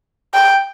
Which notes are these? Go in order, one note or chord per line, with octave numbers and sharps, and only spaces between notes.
G5